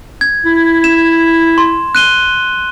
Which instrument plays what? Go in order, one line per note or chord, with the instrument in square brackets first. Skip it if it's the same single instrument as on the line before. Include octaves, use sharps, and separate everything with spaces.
[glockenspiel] G#6
[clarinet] E4
[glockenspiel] E7
C6
F#6 D#7 G7